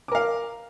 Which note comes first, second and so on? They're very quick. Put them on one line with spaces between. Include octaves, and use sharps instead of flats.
D6 A#4 F5